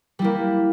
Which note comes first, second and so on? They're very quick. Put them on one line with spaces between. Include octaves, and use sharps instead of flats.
G3 E4 A#3